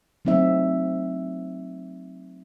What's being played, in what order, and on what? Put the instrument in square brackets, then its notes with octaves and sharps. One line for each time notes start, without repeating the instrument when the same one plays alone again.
[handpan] F#3 A3 C4 D#4 E5